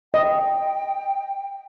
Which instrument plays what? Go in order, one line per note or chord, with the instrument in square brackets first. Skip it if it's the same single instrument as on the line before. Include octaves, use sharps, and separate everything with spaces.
[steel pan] D#5 [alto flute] G5